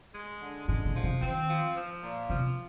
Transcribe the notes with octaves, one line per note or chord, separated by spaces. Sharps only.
G#3
D3
G#2 G#3
A#2
F3
C3
D#3 C4
F3
F3
A#2
C3 F3